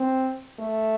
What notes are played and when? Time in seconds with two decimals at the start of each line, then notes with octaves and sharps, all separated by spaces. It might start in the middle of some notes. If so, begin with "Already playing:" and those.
Already playing: C4
0.59 A3